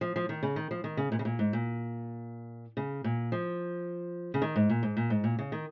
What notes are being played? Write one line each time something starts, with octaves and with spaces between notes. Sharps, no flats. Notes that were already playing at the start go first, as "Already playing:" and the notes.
F3
F3
D#3
C#3
D#3
F3
D#3
C#3
A#2
C#3
A#2
G#2
A#2
C#3
A#2
F3
C#3
D#3
G#2
A#2
G#2
A#2
G#2
A#2
C#3
D#3